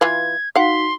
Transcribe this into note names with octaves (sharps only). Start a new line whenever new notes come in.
E3 F4 B4 G#6
D#4 F#4 F5 F#5 C6 B6